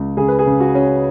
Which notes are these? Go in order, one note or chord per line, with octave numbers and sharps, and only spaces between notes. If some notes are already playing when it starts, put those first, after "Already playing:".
Already playing: C#2
C#3 G#4
B4
G#4
C#3
F#4
C#4